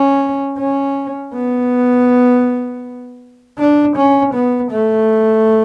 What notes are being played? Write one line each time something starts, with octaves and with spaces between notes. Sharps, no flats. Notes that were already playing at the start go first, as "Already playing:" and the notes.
Already playing: C#4
C#4
B3
D4
C#4
B3
A3